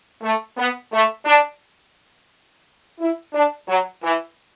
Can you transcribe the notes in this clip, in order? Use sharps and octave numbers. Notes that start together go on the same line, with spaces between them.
A3
B3
A3
D4
E4
D4
F#3
E3